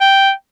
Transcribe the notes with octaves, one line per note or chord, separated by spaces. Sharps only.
G5